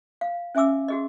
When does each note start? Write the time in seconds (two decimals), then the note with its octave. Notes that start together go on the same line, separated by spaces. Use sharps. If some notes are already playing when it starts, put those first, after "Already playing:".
0.21 F5
0.55 C#4 E5 G#5 D6 E6
0.88 F#4 G#4 D#5